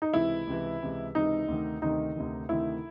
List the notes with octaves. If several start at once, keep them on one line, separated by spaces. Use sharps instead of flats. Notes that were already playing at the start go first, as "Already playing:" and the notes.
D#4
C#2 C3 E3 E4
C#2 C3 E3
C#2 C3 E3
C#2 C3 E3 D#4
D2 C3 D#3
D2 C3 D#3 D#4
D2 C3 D#3
D2 C3 D#3 E4